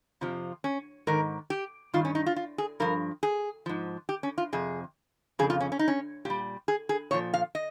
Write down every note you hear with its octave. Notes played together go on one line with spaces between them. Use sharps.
F2 C3 F3
C#4
G#2 D#3 A#4
G4
G2 D#3 F4
C#4
D#4
F4
F4
G#4
G2 F3 A#4
G#4
G#2 F3
G4
C#4
F4
F2 C3 G#4
F2 C#3 G#4
F4
C#4
C#4
D#4
C#4
A#2 G3 G4
G#4
G#4
A#2 F3 C#5
F5
D#5